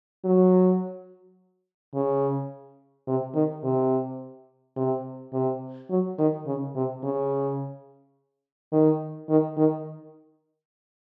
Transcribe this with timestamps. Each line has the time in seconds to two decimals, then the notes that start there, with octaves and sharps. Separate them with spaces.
0.25 F#3
1.95 C#3
3.08 C3
3.35 D#3
3.64 C3
4.76 C3
5.33 C3
5.90 F#3
6.19 D#3
6.47 C#3
6.75 C3
7.03 C#3
8.73 D#3
9.30 D#3
9.57 D#3